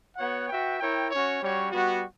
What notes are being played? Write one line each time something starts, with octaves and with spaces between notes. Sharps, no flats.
B3 F#4 C#5 F#5
F#4 B4 E5 G5
E4 A#4 C#5 G5
C#4 F#4 C#5
G3 C#4 F#4 C#5
G3 B3 F#4